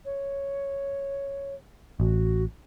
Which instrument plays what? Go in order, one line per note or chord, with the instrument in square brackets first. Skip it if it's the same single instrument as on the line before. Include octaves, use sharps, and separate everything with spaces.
[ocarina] C#5
[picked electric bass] A1 [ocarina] F#4